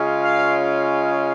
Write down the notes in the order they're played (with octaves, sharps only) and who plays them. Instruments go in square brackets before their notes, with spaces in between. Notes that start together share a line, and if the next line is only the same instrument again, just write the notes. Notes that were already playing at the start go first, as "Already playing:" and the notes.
Already playing: [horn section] C#3 G#3 C#4 F4
F5